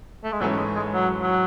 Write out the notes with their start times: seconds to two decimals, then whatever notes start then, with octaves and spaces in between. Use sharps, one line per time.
0.24 A3
0.32 G#3
0.40 G#2 E3 F#3 A3 C#4
0.57 G#3
0.76 G#3
0.94 F#3
1.22 F#3